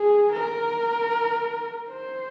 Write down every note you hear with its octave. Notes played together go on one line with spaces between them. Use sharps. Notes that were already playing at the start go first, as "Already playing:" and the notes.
Already playing: G#4
A#4
C5